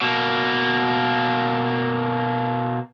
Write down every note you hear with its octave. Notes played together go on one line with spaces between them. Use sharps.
B2 A#3